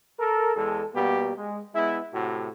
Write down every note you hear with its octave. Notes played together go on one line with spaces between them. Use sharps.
A4 A#4
E2 G#3 A4
B2 G3 A#3 B3 G4
G#3
G#3 B3 E4
A2 C3 F#4